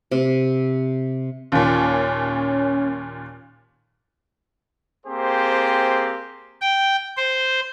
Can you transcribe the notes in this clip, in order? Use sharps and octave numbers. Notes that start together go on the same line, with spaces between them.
C3
D#2 A#2 C#4
A#3 C4 G4 G#4 C5
G5
C5